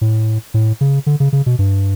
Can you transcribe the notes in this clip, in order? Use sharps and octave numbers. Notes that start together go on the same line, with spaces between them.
A2
A2
C#3
D3
C#3
C#3
B2
G2